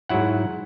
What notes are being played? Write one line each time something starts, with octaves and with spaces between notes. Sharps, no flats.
G#2 F#3 E4 F#5